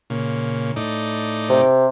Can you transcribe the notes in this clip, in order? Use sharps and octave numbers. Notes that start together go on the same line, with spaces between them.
A#2 C#3
A2 D#4 D5
C3